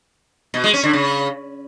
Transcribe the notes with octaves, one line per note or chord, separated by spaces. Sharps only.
B2
G#3
C#4
D3
C#3